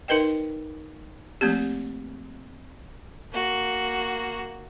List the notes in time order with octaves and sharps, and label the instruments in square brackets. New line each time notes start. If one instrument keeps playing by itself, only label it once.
[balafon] D#4 A#4 B4 D#5 G5
F3 A3 A#3 C4 G4
[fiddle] A#3 F#4